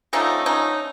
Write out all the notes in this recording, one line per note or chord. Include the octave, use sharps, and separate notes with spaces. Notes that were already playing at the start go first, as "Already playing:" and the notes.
D3 F3 A3 C#4 D#4
C#4 D#4